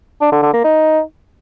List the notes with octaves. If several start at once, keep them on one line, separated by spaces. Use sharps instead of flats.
D4
D3
D3
A#3
D#4